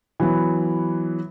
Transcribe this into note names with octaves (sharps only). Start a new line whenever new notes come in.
E3 F#3 B3